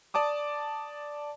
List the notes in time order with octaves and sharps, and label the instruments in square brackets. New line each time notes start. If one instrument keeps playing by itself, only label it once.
[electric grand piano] D5 A5 D6 D#6